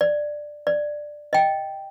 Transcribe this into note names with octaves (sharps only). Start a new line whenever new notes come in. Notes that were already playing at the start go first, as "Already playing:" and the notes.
D5
D5
D#5 G5